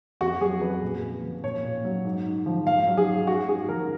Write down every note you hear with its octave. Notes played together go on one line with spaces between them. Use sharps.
F2 F#4
F#3 G#4
F2 B4
A#2
A#2
F3
A#2 C#5
A#2
F#3
G#2
G#2
F3
G#2 F5
F#3
G#4
G#2
G#2 F#4
G#2 G#4
F3 A#4